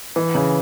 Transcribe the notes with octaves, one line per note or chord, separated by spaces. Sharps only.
E3
C#3